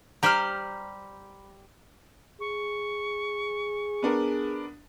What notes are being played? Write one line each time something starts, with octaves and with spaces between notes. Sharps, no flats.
G3 G4 C5 A#5 B5 F6
G#4 C#6
B3 D4 A#4